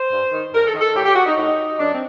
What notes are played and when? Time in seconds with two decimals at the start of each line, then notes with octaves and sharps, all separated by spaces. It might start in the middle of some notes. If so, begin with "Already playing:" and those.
Already playing: C5
0.11 G2
0.32 D#3
0.53 G2 A#4
0.67 A4
0.74 D#3
0.81 A4
0.95 A2 G4
1.05 G4
1.16 F#4
1.26 D#4
1.37 A2 D#4
1.78 F#2 D4
1.92 C4